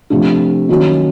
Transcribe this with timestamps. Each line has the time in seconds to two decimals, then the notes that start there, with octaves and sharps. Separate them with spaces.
0.10 C3 F3 A3 D4
0.69 D#3 F#3 A#3 C#4 F#4